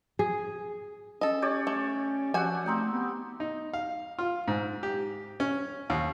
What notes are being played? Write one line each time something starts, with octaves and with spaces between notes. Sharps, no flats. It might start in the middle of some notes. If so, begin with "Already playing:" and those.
G#4
C#4 A4 D#5
G4 C#5 D5
A3
F3 F#4 G4 E5 F#5 G#5
A3 C4 D#4 G5
B3
D#4
F5
F4
G#2
G4
C#4
D#2